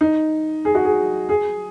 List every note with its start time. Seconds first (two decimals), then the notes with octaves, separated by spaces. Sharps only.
0.01 D#4
0.65 G#4
0.75 F#4
0.85 G#4
1.29 G#4